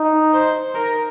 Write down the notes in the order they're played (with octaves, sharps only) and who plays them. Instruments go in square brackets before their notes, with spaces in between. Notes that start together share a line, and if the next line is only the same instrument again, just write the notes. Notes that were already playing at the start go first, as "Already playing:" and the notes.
Already playing: [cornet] D#4
[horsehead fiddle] C5
A#4